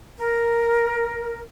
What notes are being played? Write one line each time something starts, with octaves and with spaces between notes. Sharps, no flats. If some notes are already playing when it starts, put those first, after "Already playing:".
A#4